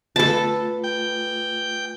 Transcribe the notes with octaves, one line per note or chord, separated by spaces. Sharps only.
A3 F4 A4 B4 A5
G5